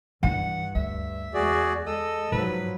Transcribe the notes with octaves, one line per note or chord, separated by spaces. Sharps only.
G2 E3 D4 F#5
D2 E5
E2 G#3 F#4 G#4 D5
G#3 A4 D#5 E6
G#2 F3 F#3 B4